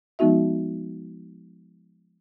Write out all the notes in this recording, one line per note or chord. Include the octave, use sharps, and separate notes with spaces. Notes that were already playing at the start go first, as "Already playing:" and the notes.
F3 G#3 B3 D#4 F#4 E5